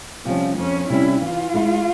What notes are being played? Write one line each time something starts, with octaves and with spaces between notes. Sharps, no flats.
C3 F3 G3 C#4
F2 C#4
C3 G3 C#4 E4
E3 F4
G#3 E4